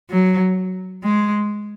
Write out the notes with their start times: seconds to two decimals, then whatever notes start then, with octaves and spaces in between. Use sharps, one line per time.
0.10 F#3
1.04 G#3